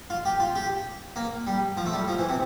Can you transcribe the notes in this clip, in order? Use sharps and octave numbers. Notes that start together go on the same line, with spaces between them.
F4
G4
F4
G4
A#3
G3
F3
A3
G3
F3
E3
C3